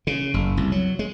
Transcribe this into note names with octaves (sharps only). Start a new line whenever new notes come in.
C#3
F#1
C2
F#3
G#3